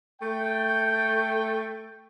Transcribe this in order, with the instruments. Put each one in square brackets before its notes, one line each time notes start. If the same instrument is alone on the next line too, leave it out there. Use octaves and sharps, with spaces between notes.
[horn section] A3 G5